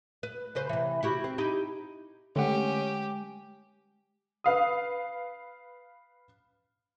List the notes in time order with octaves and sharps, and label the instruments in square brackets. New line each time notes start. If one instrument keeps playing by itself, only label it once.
[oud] B4
C#3 B4 C5
C3 E3
E4 F#4 G4
C4
D#4 E4 G4
[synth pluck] D3 A3 F#5 [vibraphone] G#3 [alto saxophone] C#4 [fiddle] G4
[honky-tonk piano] B4 F5 D#6